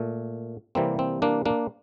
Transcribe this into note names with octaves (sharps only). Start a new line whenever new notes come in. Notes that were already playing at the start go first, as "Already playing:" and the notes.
Already playing: A#2 A3
C3 E3 G3 A#3 C4
C4
A#3 D4
A#3 D4